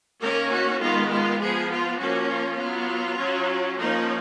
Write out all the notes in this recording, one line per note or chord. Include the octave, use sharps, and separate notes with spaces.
D#3 A#3 C#4 A#4
F#4
D#3 G#3 B3 F4
F4
F3 B3 G#4
F4
F3 A#3 C#4 F#4
F4
F#3 B3
F#3 C#4
F3 A#3 C#4 D#4